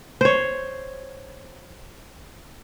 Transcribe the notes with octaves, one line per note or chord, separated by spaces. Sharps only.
C5 C#5